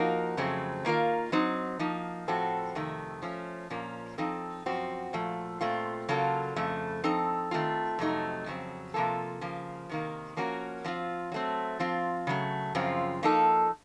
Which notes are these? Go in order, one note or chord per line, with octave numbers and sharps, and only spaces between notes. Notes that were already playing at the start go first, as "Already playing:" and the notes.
Already playing: F3 A#3 D#4 F#4 A#4
F2 C#3 F#3 A3 C4
D#3 A#3 F4 A#4
F#3 C4 D#4
F3 A#3 D#4
A2 F3 C4 F#4 A4
F2 C3 D#3 A3
F3 A3 C#4
A#2 F3 A#3 C#4
F3 C4 D#4 A4
F#2 F3 C4 F#4
A#2 F3 A3
A#2 A3 C4 F4
C#3 F#3 A#3 F4 A4
F2 C#3 A3
F3 C4 D#4 A4
D#3 A3 C4 F4
F2 C3 F#3 A3 D#4
F2 C#3 F#3 C4
C3 F3 A#3 F4 A4
C#3 F3 A#3
C3 D#3 A#3
F3 A#3 C#4 F#4 A#4
F3 C4 F4
F#3 A3 C4
F3 C4 F4
C#3 F#3 A3
F#2 C#3 F3 C4 F4
F3 A#3 D#4 A4